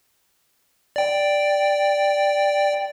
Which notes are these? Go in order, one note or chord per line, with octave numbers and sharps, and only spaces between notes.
D5 G5